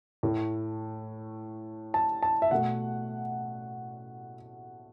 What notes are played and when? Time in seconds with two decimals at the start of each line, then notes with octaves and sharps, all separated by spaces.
0.23 A2 A3
1.94 A5
2.23 A5
2.42 E5
2.51 B2 A3 F#5